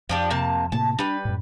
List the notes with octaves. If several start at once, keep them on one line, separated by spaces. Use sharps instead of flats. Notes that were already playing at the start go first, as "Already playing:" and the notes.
F2 F3 D4 G4
C3 A#3 A5
A2 C3 A#3 A5
G3 D4 B4
F#2 A2